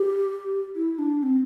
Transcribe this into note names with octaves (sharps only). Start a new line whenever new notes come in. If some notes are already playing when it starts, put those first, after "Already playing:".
Already playing: G4
E4
D4
C4